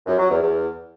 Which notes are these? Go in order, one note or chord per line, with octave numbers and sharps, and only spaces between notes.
F#2
F#3
E2
E2